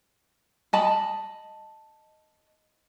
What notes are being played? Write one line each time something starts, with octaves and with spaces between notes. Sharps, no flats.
D#5 A5 B5